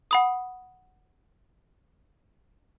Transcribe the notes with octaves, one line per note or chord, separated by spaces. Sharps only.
F#5 B5 D#6